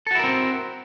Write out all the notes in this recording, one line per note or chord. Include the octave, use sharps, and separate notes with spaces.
C4 E4 F#4 A4 A#4